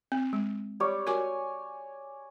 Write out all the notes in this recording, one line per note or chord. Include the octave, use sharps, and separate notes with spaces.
C4
G#3
G3 C#5 D5
F#4 A#4 G#5 D6